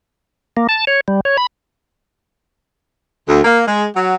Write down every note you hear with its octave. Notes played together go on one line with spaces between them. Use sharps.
A#3
A5
C#5
G3
C#5
B5
D2
A#3
G#3
F#3